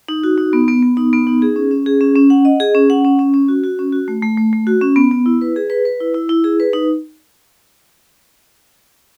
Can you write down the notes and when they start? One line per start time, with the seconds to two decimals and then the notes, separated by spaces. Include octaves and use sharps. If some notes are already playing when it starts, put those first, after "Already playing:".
0.09 D#4
0.24 F#4
0.38 D#4
0.53 B3
0.68 B3
0.83 B3
0.97 D#4
1.13 B3
1.27 D#4
1.42 G#4
1.56 C#4
1.71 C#4
1.86 G#4
2.01 C#4
2.16 C#4
2.30 F#5
2.45 D#5
2.60 G#4
2.75 C#4
2.90 F#5
3.04 C#4
3.19 C#4
3.34 C#4
3.49 F#4
3.64 F#4
3.79 C#4
3.93 F#4
4.08 A3
4.22 A3
4.37 A3
4.53 A3
4.67 F#4
4.81 C#4
4.96 B3
5.11 B3
5.26 E4
5.41 B4
5.56 G#4
5.70 B4
5.85 B4
6.01 E4
6.14 E4
6.29 E4
6.44 G#4
6.60 B4
6.73 D#4